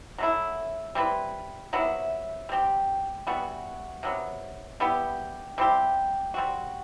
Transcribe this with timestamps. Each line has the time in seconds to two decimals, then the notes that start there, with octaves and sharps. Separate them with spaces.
0.18 F#3 A3 E4
0.95 G3 C4 E4 B4
1.73 C3 F#3 B3 E4
2.49 G3 C4 G4
3.27 E3 G3 B3 F#4
4.03 C3 F#3 B3
4.80 G3 B3 E4 G4
5.58 G3 C4 E4 G4
6.34 G3 C4 F#4